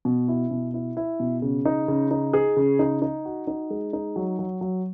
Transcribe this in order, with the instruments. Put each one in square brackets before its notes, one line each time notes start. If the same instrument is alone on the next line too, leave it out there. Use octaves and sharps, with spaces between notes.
[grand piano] B2
E4
B2
E4
E4
B2
C#3
D#4
C#3
D#4
G#4
C#3
D#4
D#4
F#4
D#4
G#3
D#4
F#3
F#3
F#3